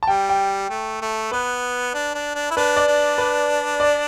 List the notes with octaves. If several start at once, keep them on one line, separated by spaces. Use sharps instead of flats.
A5
G3 G5
G5
A3
A3
B3 B4
D4
D4
D4
E4
D4 B4
D5
D4
B4
D5